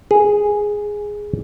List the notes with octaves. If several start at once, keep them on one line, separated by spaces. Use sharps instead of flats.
G#4